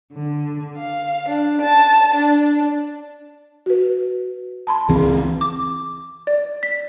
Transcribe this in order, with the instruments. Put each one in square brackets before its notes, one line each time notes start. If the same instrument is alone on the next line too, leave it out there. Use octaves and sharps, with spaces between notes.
[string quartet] D3
F5
D4
A5
D4
[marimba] F#4 B4
A5 B5 C6
[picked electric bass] C#2 E3 C4 [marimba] G#4
[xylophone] D6
D5
B6